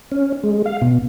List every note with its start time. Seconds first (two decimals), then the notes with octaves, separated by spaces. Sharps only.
0.12 C#4
0.43 G#3
0.66 F5
0.82 B2